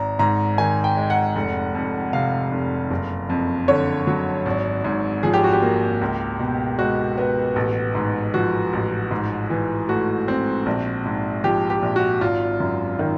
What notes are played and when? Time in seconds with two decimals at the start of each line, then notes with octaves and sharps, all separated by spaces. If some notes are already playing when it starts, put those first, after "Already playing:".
Already playing: G#1 A#5
0.19 G#2 A#5
0.58 D#3 G#5
0.84 G5
0.97 G#3
1.10 F#5
1.36 F1
1.75 F2
2.13 C3 F5
2.52 F1
2.91 F#1
3.30 F2
3.68 D3 C#5
4.07 F#3
4.46 G#1
4.84 G#2
5.23 F3 G#4
5.33 G4
5.44 F#4
5.53 G4
5.62 A#3
6.01 C#2
6.39 B2
6.79 G#3 F#4
7.18 B3
7.56 A1
7.95 G#2
8.34 F3 F#4
8.73 A1
9.11 G#2
9.50 E3
9.89 A3 F#4
10.28 C4
10.66 A#1
11.05 G#2
11.44 F3 G4
11.70 G4
11.82 A#1
11.96 F#4
12.21 G#1 F4
12.60 F#2
12.99 D#3